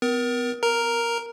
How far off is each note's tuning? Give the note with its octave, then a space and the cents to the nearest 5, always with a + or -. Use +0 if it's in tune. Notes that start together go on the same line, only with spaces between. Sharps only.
B3 +40 A#4 +30
A#4 +0 A#5 +0